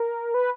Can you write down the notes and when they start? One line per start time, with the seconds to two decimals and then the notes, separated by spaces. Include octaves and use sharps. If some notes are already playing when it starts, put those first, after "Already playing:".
Already playing: A#4
0.34 B4